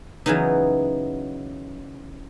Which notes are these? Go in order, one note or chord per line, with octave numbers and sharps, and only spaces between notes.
C#3 E3 F#3 B3 D#4